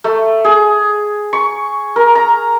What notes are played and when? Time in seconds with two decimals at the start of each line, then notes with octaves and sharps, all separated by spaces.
0.04 A3
0.45 G#4
1.33 C#6
1.96 A#4
2.15 A#5